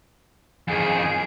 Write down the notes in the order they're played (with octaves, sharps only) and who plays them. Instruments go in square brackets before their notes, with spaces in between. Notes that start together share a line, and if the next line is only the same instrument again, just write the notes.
[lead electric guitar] F2 D#3 [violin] G#4 D7 [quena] G#5